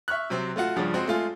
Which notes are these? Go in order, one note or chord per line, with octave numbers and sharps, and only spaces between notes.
E5 C#6 F6 F#6
C3 F#3 C4
A3 F4 F#4 F#5
G2 C#3 F3 C#4 D4
G#3 C4 F#4
G#3 A3 F4 G#4